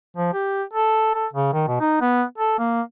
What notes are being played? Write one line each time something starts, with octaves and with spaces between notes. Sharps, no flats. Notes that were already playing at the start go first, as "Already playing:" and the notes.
F3
G4
A4
A4
C#3
D#3
B2
D#4
B3
A4
A#3